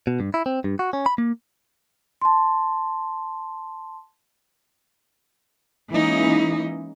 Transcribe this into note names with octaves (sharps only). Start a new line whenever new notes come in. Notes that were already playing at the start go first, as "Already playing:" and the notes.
B2
G2
E4
C4
G2
F#4
C#4
B5
A#3
A5 C6
E3 G#3 A#3 C#4 D#4 E4